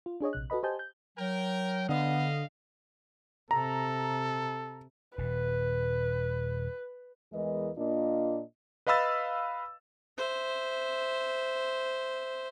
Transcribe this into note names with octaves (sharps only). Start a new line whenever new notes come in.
F4
D4 G#4 C#5 D#5
A#1 C3 F#6
F#4 A4 B4 D#5 B5
G4 C5 D#5 G#5 A5 G6
G6
F#3 A#4 G5
D3 B3 D#5 F5
C3 A4 A#5
D#1 A#2 B4
E2 E3 G#3 A#4 B4 D#5
A#2 A#3 D4 F4 D#5
B4 D#5 F5 B5 E6 A6
C5 E5